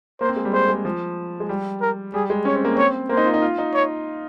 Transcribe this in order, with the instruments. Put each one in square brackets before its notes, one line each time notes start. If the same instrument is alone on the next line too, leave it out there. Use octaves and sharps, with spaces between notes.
[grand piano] A#3 [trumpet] C5
[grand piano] C4
G#3
G3
[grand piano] G#3 [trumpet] C5
[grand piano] G#3
F3
G#3
G3
[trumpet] A#4
[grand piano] G3 [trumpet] G#4
[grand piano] G#3
[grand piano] C#4 [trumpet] C#5
[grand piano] C4
A#3
[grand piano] C4 [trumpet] C#5
[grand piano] A#3 [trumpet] C5
[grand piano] D#4
F4
D#4
F4
D#4
[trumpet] C#5